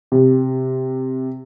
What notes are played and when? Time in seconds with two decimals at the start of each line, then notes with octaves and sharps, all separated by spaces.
0.12 C3